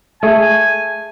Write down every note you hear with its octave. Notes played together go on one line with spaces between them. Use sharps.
A3 G#4 G#5